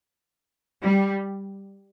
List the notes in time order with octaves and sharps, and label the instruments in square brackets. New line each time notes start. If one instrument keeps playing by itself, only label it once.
[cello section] G3